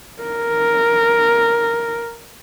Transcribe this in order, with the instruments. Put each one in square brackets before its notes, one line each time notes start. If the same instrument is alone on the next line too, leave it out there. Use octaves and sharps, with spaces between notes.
[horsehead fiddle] A#4